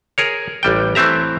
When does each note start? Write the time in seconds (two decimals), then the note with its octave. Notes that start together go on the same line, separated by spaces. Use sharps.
0.18 G#4 A#4 C#5
0.63 A1 G3 G5
0.95 E3 A3 C4 E5 A#5